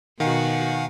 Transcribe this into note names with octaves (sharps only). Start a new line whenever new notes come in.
B2 D#3 F#4 F5 F#5 G#5